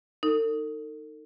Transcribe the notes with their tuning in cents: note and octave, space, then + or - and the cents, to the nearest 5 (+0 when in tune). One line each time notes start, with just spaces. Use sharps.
D#4 +0 A4 +45